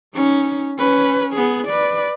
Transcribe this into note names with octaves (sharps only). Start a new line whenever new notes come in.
C#4 D#4
C#4 B4
B3 G#4
B4 D5